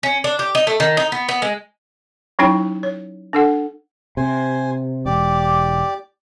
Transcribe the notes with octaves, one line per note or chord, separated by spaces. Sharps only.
C#4
D4
G4
D#4
A3
D#3
D#4
B3
B3
G#3
F#3 C#4 D#4 E4 C#5 G5
C#5
D4 A4 F#5
C3 C5 G#5 C6
E1 G4 D5 D6